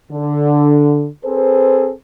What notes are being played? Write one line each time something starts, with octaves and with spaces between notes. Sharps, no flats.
D3
C4 G#4 A4 B4 C5